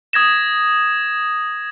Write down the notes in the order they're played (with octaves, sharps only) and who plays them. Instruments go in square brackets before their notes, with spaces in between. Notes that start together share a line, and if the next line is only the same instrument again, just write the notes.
[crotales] D#6 G#6 A#6 E7